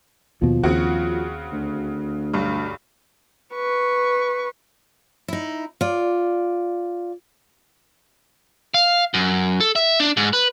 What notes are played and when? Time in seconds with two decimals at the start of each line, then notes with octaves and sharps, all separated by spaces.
0.42 D#2 B2 F3
0.63 D#2 C#3 C4 F#4
1.53 D2
2.34 B1 G2
3.55 B4 C#6
5.28 D#4 E4
5.81 F4 D5
8.74 F5
9.14 F#2
9.60 A4
9.76 E5
10.00 D4
10.17 G#2
10.33 B4